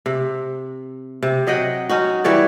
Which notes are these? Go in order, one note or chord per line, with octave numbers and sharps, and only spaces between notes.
C3
C3
F#3 D#5 F#5 G5
C#4 D#4 F#4
E3 G3 C#5 D5